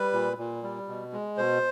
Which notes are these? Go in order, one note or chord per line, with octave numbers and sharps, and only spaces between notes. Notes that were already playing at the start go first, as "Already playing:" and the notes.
Already playing: G3 B4
A#2
A#2
G3
B2
G#3
B2 C5